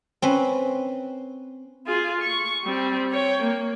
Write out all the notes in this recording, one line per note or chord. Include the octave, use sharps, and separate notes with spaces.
C4 C#4 B4
F4 G#4
C#6
G3 C4
C#5 G5
A#3